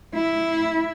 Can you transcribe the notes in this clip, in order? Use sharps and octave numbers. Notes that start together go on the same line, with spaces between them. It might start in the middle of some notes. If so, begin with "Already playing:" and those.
E4